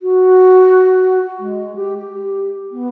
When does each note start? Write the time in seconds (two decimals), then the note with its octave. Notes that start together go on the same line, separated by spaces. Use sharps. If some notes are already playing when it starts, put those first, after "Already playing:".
0.02 F#4
1.39 G#3
1.76 G4
1.98 G4
2.72 B3